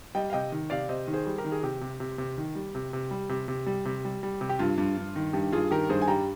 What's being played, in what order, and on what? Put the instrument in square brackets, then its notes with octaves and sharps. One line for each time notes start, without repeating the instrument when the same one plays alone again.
[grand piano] G3 D#5 G5
F5
C3 D#5 G5
D#3
C3 D5 F5
C3 C5 D#5
D#3
G#4 C5
G3
G4 A#4
D#3
G#4
C3 G4
C3
C3
C3
D#3
G3
C3
C3
G3
C3
C3
G3
C3
G3
G3
C3
G4
G2 F4
G2
G2
D#3
G2 G4
G2 F4 G#4
D#3 G4 A#4
G2 G#4 C5
G#5
G3 G5 A#5